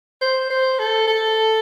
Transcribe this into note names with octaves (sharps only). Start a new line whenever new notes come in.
C5
C5
A4
A4